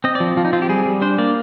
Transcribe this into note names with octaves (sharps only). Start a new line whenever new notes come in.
C4 D#5
D5
F3
F3 F4
D#4
C4 F4
G4
G3 G#4
G3
D4 C5
A#3 D5